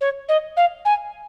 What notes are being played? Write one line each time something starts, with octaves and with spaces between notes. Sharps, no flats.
C#5
D#5
F5
G#5